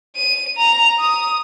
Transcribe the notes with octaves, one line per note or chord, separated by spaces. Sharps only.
D#7
A#5
D#6